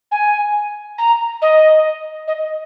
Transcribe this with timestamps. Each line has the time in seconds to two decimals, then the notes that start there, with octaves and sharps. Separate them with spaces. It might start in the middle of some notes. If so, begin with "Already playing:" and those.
0.11 G#5
0.98 A#5
1.41 D#5
2.27 D#5